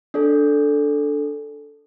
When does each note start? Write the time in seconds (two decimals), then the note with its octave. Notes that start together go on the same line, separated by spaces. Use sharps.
0.14 D4 A4 D5